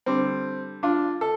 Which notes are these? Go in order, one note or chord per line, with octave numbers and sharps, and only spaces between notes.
D3 G3 C4
D4 F4
A4